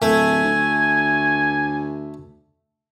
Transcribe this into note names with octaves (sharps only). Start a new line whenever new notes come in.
D1 A3 G#5
D2